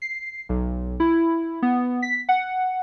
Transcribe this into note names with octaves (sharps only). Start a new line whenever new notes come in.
C7
B1
E4
B3
B6
F#5